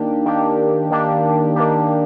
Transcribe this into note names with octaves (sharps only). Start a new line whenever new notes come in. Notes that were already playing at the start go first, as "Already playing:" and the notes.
Already playing: D#3 A#3 D4 G4
D#3 A#3 D4 G4
D#3 A#3 D4 G4
D#3 A#3 D4 G4